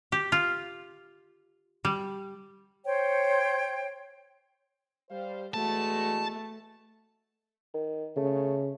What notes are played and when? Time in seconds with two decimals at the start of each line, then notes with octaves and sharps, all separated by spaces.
0.12 G4
0.32 F4
1.85 G3
2.85 C5 C#5 G5
5.10 G3 C5 F5
5.54 E2 G#3 A3 F#4 A5
7.74 D#3
8.16 C#3 A3